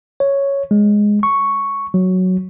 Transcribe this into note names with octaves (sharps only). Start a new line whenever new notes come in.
C#5
G#3
C#6
F#3